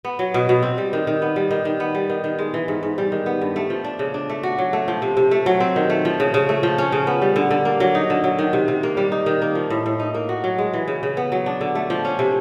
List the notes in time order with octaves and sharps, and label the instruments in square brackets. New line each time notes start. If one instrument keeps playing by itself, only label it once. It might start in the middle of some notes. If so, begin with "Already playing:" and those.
[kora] B3
F#3
B2
B2
C4
G3
D#3
D#3
B3
G3
D#3
D#3
B3
G3
D#3
D#3
G#3
E3
G#2
G#2
G3
D#3
B3
G2
A3
F3
D4
C#3
D4
A3
F#4
F#3
A3
F3
C3
C3
A3
F#3
C4
D#3
A3
F3
C#3
C#3
A3
F3
C#4
C#3
B3
G3
D3
D3
A#3
F#3
D#4
D3
F#3
D#3
C3
C3
A#3
G3
D#4
D#3
A#3
F3
A2
A2
D#4
A#3
F#4
F#3
G#3
E3
C#3
C#3
B3
F#3
D4
D3
A3
F3
C#4
C3